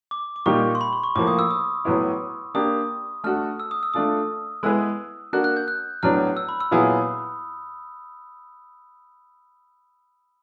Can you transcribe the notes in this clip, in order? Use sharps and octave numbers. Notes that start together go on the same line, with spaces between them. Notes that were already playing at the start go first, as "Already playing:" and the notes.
D6
D6
A#2 G3 A#3 D#4 G4 C#6
C6
B5
C6
C#6
A2 F3 A#3 D6
D#6
E6
D#6
A2 F#3 B3 E4
A#3 D4 G4 D#6
A3 D4 F#4 A4 F6
E6
D#6
E6
A3 D4 F4 A4 D#6
G#3 B3 E4 G#4 B4 E6
A#3 D4 F#4 A#4 F#6
F#6
G6
F#6
A2 F#3 B3 D4 F6
E6
B5
E6
A#2 F#3 B3 E4 G#4 D#6